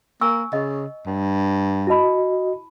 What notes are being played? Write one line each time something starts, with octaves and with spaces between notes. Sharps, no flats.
A#3 G#5 C#6 E6
C#3 D#5
G2
E4 F#4 D#5 A5 B5